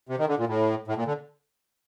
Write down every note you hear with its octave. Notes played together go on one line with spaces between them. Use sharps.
C3
D#3
D3
A#2
A2
A2
A#2
D3